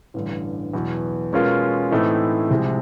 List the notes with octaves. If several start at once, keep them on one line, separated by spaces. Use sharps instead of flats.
A1 G2 D3
E2 B2 F#3
B2 G#3 C#4 F4 A#4
A2 E3 A3 C4 D#4
C2 C3 F3 G#3